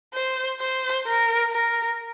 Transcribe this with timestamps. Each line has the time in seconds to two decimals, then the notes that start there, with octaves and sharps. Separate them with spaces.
0.14 C5
0.60 C5
1.06 A#4
1.52 A#4